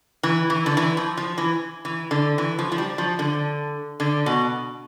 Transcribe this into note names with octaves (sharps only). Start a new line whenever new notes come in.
E3
E3
D3
E3
F3
F3
E3
E3
D3
E3
F3
F3
G3
F3
D3
D3
B2